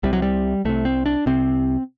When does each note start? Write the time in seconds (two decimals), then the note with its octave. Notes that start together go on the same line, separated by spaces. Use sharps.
0.03 C2 C3 G3
0.13 F#3
0.22 G3
0.65 C2 C3 A3
0.85 C4
1.06 D4
1.26 C2 C3 C4